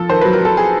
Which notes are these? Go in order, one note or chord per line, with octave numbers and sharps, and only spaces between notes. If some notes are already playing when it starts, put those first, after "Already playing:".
Already playing: F3 A4
D#3 C5
F#3 B4
A#4
F#3 A4
G#4